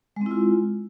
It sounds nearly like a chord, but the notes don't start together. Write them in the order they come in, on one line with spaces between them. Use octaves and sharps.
G#3 C4 E4 F4